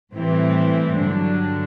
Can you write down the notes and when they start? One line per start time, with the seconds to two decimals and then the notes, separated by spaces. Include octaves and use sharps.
0.13 A2 E3 G3 C4
0.98 G2 D3 F#3 D4